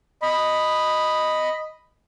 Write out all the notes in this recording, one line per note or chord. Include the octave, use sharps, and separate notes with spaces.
D#5 B5